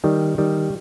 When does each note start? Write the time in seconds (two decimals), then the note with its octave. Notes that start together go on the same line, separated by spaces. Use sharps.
0.04 D#3 G3
0.38 D#3 G3